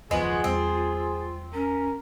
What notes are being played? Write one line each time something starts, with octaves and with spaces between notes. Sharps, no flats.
F#1 D#2 F3 G#3 B3 F4 F#4 G#4
E2 G3 C4
C#4 A#4